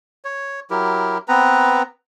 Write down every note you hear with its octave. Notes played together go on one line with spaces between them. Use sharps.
C#5
F#3 E4 G4 A#4
B3 C4 B4 A#5